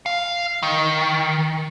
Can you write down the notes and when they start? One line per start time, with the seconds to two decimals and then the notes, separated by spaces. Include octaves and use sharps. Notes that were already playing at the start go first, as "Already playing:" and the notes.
0.06 F5
0.63 D#3